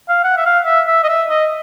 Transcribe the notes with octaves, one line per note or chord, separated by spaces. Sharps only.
F5
F#5
E5
F5
E5
E5
D#5
E5
D#5